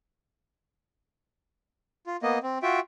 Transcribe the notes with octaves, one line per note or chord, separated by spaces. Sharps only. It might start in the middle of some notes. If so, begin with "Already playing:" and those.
F4
A#3 B3 D#5
C4
F4 F#4 E5 G5